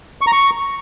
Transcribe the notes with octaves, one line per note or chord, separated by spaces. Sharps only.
C#6
A#5
C#6